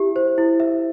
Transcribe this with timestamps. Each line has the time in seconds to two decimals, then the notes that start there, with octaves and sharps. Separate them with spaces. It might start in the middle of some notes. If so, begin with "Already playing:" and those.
Already playing: E4 G4 E5
0.16 C5
0.38 E4
0.60 E5